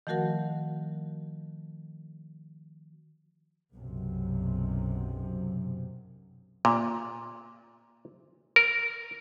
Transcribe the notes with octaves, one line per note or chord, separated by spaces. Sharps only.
D#3 F3 A3 F#4 A#4 F#5
B1 F#2 C3
A#2
A#4